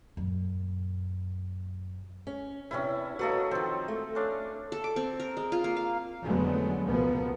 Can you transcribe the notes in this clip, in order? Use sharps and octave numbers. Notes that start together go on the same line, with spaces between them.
F#2 A#2
C#4
E2 C3 C#4 D4 E4
F#3 A#3 B3 A4 B4 D#5
D#3 F3 C4
A3
C#4 D4 F5
A4
D6
C4
A#4
G#3
F4
A#3
F5
F1 D3 F#3 G#3 A3 B3
C#2 B2 F3 A#3 B3